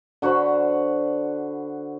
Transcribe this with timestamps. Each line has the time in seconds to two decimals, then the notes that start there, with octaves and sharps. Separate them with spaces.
0.22 D3 F#4 C5 B5